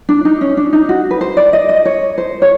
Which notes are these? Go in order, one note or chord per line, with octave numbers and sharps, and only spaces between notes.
D4
D#4
C#4
D4
D#4
F#4
B4
C5
D5
D#5
D#5
C#5
C5
C#5